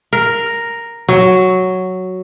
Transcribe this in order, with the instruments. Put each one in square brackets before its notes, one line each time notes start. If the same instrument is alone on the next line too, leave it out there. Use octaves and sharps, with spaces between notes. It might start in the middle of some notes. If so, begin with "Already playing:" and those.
[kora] A#4
F#3